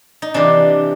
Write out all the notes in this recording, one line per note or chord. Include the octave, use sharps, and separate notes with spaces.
D#4
C3 E3 D4